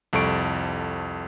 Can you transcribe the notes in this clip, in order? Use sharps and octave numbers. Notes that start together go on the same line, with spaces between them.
C2 F2 A4 C#6 D7